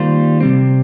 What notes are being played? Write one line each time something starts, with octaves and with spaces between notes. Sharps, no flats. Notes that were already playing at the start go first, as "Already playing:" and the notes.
Already playing: D#3 G3 A#3 F4 C5
C3 G3 C4